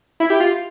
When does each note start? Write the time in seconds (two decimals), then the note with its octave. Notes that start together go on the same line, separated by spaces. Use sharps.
0.20 E4
0.30 G4
0.40 F4